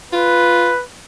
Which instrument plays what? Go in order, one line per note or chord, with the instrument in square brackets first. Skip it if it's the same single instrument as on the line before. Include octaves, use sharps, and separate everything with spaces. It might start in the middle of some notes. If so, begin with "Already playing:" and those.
[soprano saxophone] F4 [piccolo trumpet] B4